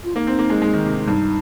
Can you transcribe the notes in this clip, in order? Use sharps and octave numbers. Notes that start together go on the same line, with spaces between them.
F4
A#3 D#4
C4
A#3
G#3
G#3
D#3
C3
G2 D#4